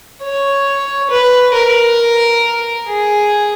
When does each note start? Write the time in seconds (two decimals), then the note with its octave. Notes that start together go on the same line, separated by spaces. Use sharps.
0.23 C#5
1.10 B4
1.55 A#4
2.87 G#4